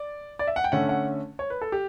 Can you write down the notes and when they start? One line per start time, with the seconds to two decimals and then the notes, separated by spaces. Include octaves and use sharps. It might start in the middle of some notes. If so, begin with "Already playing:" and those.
Already playing: D5
0.39 D5
0.47 E5
0.56 F#5
0.64 G5
0.72 D3 A3 C#4 F#5
0.89 F#5
1.39 C#5
1.50 B4
1.61 A4
1.72 G4